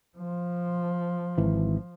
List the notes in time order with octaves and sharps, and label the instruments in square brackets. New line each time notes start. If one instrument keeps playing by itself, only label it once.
[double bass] F3
[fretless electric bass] G#1 E3